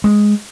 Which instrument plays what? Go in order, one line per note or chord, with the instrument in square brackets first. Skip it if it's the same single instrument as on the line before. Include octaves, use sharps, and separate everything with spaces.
[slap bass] G#3